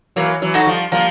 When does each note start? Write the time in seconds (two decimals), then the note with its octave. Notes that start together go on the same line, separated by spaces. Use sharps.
0.16 E3 F#3 A#3
0.42 E3 F#3
0.54 D#4 F#4 A4
0.67 F3 G3
0.92 F3 G3 A#3